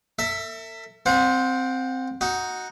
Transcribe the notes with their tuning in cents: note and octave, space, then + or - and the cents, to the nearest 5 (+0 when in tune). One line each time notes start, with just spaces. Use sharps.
A4 +45 E5 +0
C4 +0 C5 +0 F#5 -40
D#4 +10 F#4 +0